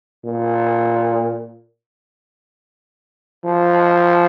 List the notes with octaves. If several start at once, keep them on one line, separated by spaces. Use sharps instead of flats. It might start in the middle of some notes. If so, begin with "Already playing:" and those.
A#2
F3